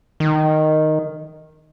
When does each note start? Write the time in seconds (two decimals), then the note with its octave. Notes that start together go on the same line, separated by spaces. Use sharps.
0.20 D#3